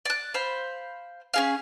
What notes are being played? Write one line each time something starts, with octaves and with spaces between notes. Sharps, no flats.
D5 F#6
C5 F5 B5
C#4 G#4 F5